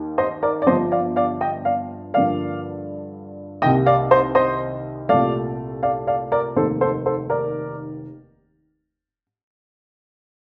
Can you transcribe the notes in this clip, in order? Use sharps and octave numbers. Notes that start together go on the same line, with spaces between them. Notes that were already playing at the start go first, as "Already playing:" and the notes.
Already playing: D#2 D#3
C5 D#5
A#4 D5
D5
G1 G2 F3 C5 D#5
D5 F5
D5 F5
D#5 G5
D5 F5
G2 D3 F3 A#3 D5 F5
C2 C3 D#3 A#3 D#5 G5
D5 F5
C5 D#5
C5 D#5
C2 A#2 A3 D5 F5
D5 F5
D5 F5
A#4 D5
F1 D#2 D#3 A#3 A4 C5
A4 C5
A4 C5
A#4 D5